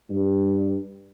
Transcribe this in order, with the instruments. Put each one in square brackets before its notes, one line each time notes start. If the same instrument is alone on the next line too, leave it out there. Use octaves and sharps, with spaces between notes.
[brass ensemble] G2